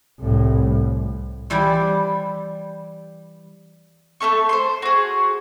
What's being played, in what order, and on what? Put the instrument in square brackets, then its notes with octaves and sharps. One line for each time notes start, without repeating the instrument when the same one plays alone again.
[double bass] C2 A2
[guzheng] E3 G3 E4 C5 D5
[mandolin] A3 B3 A4 C#6
C5 C6
F#4 G#4